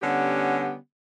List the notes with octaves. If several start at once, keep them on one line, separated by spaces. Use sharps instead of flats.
D3 G3 B3 C#4 G4